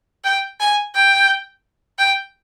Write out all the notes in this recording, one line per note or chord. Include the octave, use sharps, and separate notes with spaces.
G5
G#5
G5
G5